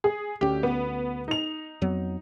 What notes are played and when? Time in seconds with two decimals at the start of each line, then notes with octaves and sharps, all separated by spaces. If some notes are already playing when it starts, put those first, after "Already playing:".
0.04 G#4
0.41 D2 C#4 G4
0.63 B3
1.28 D#4 F7
1.82 F2 F#3 B3